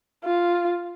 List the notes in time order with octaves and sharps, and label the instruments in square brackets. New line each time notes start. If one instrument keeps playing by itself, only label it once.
[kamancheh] F4